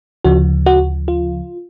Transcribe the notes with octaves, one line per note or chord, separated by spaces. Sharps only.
D2 C#3 F3 F#4
F#4
F4